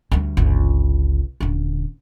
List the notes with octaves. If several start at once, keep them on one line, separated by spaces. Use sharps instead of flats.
D2 G3
G1 C#2
D#1 D3